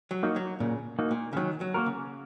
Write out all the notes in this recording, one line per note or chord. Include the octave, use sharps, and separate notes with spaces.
F#3
A#3 D#4 F#4
F#3
A#2 C#3
A#3 D#4 F#4
A#2
C#3
D#3 F#3
F#3
A#3 F#4 A#4
C#3